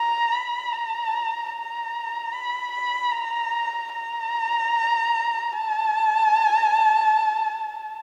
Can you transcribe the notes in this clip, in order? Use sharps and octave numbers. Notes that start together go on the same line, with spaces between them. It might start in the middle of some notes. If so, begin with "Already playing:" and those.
Already playing: A#5
B5
A#5
A#5
B5
B5
A#5
A#5
A5